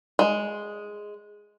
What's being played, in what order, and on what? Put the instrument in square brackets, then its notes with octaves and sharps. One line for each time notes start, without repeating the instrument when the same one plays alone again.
[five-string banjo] G#3